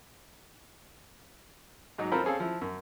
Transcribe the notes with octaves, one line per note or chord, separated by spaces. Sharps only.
G#2 F#3 D#4
C4 F4 A4 A#4 C5 B5
C4 C#4 G#4 A4 F5
F3 E4
F#2